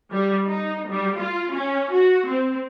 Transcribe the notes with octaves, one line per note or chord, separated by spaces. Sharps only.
G3
D#4
G3
F4
C#4
F#4
C4